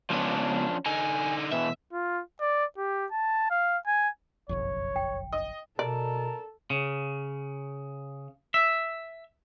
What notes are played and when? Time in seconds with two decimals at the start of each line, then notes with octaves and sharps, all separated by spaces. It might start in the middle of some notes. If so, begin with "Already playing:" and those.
0.10 C#2 F3 B3 C#4 D4
0.86 D3 D#4 G#5
1.53 B2 E3 E5
1.93 F4
2.41 D5
2.78 G4
3.12 A5
3.51 F5
3.87 G#5
4.49 F#1 B1 F2 C#5
4.96 G5
5.33 D#5
5.79 B2 A4 A#4 D5 A5
6.70 C#3
8.54 E5